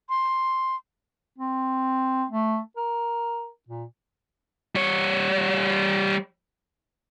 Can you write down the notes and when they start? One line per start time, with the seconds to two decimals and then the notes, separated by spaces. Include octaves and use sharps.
0.09 C6
1.39 C4
2.30 A3
2.77 A#4
3.69 A#2
4.75 G3 C#5